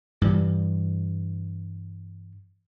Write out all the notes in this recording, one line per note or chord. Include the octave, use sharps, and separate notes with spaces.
G2 E3 G3